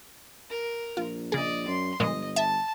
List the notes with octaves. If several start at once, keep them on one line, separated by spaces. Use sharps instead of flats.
A#4
A#1 F4
C#3 G#4 D5 D#5
F#2 C6
G1 A#2 F3 G#3 D#5
E5 A5